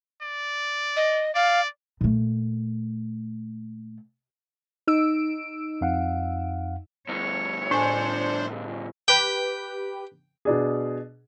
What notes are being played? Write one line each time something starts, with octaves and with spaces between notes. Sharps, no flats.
D5
D#5
D5 F5
A#2 A3
D#4 E6 D7
F2 F5 F#5
D2 G2 C#5
A2 D4 C5 G#5
G4 B4 G5
B2 D4 G#4